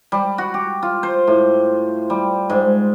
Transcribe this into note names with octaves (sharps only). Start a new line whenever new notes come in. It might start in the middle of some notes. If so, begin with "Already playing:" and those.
G3
F#4
G4
F4
C5
A2
G3
G#2